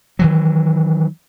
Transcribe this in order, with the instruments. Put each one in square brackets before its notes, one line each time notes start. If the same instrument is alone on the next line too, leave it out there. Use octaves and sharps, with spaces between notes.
[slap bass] D#3 E3 F#3